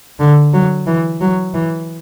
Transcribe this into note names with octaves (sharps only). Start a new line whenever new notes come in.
D3
F#3
E3
F#3
E3